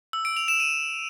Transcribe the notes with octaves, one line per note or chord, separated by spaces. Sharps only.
E6
D7
F7
E7
D#7